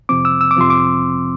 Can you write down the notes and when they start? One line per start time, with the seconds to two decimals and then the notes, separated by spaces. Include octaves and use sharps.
0.09 F2 C3 F3 C4 D6
0.25 E6
0.41 E6
0.51 D6
0.57 F2 C3 F3 C4 C6
0.70 D6